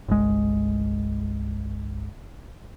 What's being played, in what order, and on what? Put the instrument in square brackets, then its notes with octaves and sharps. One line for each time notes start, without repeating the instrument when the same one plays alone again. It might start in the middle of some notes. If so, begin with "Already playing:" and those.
[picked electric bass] G1 C2 G#3